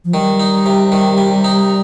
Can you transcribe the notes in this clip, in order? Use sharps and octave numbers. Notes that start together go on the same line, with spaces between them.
F3
D#3 G3
D#4
C3
D#3
C3
D#4